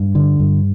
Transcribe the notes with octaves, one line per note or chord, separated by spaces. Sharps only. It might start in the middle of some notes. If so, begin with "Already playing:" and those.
Already playing: G2
D3
G2